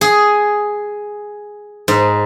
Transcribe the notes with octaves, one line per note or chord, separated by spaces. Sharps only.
G#4
G#2